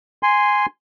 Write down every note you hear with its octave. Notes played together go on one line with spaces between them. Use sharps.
G#5 C6